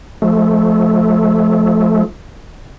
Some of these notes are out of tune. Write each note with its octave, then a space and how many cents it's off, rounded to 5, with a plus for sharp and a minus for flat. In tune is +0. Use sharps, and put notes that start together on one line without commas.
F3 +0 A3 -20